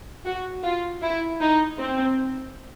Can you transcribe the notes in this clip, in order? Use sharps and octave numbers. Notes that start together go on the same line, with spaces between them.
F#4
F4
E4
D#4
C4